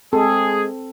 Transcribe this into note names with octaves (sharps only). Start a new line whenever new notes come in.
G#3 C4 G#4 A4